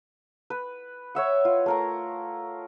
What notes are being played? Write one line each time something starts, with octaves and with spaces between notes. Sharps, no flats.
B4
C#5 E5 F#5
F4
A3 A#4 A#5